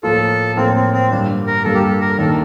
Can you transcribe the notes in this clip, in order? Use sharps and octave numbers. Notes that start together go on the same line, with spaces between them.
A2 F3 A#3 F4 A4
A2 F3 A#3 C4 F4
C4
C4
G2 D3 G3 A#3 D4
A#4
G2 D3 G3 A#3 A4
G4
A4
A#4
D#2 D#3 A#3 D4 A4